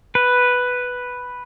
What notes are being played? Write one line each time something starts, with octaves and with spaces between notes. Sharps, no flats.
B4